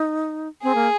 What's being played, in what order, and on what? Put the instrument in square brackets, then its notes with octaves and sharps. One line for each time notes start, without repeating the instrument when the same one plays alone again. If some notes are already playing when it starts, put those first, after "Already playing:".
Already playing: [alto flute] D#4
[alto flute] C4 [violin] G#4
[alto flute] A#3